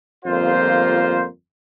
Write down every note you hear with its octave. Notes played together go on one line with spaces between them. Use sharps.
G1 F2 A#3 F4 C5